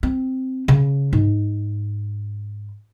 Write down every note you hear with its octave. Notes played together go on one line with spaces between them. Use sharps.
C4
C#3
G#2